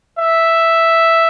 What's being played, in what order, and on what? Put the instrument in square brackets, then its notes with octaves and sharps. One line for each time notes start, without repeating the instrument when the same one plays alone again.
[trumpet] E5